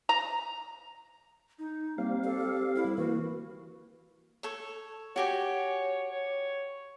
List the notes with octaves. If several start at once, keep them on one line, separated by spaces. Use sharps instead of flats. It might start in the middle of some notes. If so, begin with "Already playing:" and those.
A#5
D#4
G3 A#3 C4 F5
G4 A4
E4
E3 A#3 F#4 B4
A4 C#5
F#4 G4 C#5 G#5
C#5